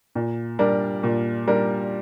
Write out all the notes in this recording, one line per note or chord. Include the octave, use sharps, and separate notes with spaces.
A#2
G3 D4 A#4
A#2
G3 D4 A#4